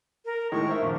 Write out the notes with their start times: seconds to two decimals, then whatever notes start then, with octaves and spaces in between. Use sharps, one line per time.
0.25 A#4
0.52 A2 D#3 G#3 C#6
0.67 A#4 C5 E5
0.82 A#1 D#2